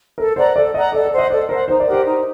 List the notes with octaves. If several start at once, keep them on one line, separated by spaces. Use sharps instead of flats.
A4 A#4
C5 D5 F#5 A#5
A4 D5
D5 D#5 F#5 A#5
A4 D5
D5
C5 F#5
D#5
A4 D5
A#4 C5 F#5
D#4 C5
D5
G4 A#4 F#5
C5
D#4